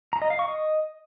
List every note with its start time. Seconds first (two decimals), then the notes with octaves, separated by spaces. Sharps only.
0.13 A#5
0.22 D#5
0.30 F5
0.39 C#6
0.48 D#5